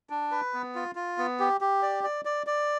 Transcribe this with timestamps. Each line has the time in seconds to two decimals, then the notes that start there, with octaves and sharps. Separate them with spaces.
0.10 D4
0.31 B4
0.53 B3
0.75 F4
0.95 F4
1.18 B3
1.40 G4
1.61 G4
1.83 D5
2.04 D5
2.25 D5
2.47 D5